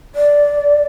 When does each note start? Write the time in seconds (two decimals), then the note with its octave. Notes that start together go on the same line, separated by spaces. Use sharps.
0.15 D5